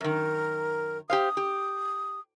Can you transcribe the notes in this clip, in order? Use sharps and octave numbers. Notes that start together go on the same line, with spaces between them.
F#2 D#3 A#4
G4 C5 F5 D#6
G4